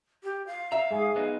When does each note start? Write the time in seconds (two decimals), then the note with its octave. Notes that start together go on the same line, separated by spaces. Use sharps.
0.23 G4
0.47 F5
0.72 E5 A#5
0.91 G#2 G#4
1.16 B3 D#4